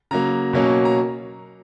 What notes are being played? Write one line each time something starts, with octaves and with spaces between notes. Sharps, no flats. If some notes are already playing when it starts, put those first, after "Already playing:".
C#3 F#3 A#3 A#5
B2 F#3 A#3 C#4
A#5